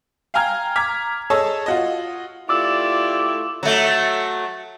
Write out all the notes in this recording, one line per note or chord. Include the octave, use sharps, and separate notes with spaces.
F5 G5 G#5 A#5 F6 G#6
A#5 D6 F6 G#6 B6
G#4 A4 C#5 D#5 A5 E6
F4 F#4 D#5
A3 E4 F4 G4 D5 D6 E6
F#3 A3